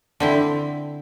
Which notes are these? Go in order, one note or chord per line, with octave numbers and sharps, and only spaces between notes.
D3 C4 E4